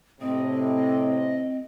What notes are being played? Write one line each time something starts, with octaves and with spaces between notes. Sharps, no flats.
A2 C3 C4 D#5